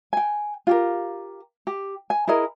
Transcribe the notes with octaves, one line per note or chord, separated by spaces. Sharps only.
G5 G#5
F4 G4 A#4
G4
G#5
E4 G#4 A#4 D#5